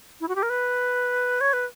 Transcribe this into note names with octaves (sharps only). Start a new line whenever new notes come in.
E4
F#4
G4
A#4
B4
C#5
B4